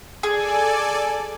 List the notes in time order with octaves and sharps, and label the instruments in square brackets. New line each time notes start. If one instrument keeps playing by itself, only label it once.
[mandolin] G#4 [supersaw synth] A4 D5 G#5